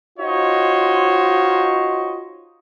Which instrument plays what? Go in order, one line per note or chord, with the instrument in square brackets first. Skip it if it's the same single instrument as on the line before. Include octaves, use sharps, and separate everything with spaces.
[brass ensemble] D#4 F4 F#4 C5 C#5 D#5